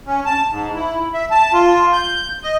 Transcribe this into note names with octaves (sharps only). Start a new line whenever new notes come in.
C#4
A5
G#2
E4
E5
A5
F4
G6
D#5